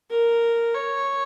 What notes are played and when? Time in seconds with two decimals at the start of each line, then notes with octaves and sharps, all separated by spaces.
0.11 A#4
0.74 C#5